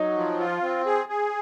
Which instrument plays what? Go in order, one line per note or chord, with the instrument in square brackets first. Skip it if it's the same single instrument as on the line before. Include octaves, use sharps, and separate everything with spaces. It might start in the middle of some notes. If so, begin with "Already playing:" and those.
Already playing: [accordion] F#3 [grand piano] D#4
[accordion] F3
F4
C4
G#4
G#4